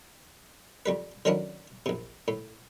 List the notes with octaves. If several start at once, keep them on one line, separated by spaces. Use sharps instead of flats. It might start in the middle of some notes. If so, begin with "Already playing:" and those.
F2 G3 B4
D3 D#3 F#3 C#4 D4 E4
A#1 C3
A2